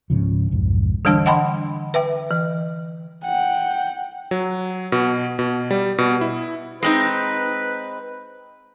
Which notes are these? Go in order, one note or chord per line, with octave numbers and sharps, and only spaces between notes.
C#2 G#2 C#3 F3
B1 F2 G#2
D3 E3 G3 D4 A5 E6
D#5 F#5 G5 A5 B5 C6
B4 E5 G5
E3
F#5 G5
F#3
B2
B2
G3
B2
E4
G#3 C4 D#4 B4